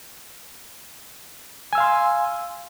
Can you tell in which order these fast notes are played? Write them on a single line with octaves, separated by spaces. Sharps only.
G#5 E6 F5 C6